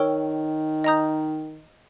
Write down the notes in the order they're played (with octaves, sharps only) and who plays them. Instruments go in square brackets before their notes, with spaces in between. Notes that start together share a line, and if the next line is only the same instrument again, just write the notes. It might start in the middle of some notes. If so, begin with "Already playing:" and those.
Already playing: [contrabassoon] D#3 [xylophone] A#4 C#5 G5 C#6 E6
[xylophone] D#5 A#5 D#6 G6